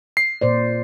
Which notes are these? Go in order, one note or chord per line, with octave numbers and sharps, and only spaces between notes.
C7
A#2 C5 D5